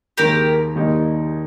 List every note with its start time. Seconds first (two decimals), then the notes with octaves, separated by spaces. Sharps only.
0.18 D#2 D#3 G#3 G4 A#4
0.75 D#2 D#3 G3 A#3 D#4